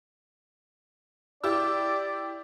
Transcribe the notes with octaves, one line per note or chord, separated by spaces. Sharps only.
E4 G4 D5 E6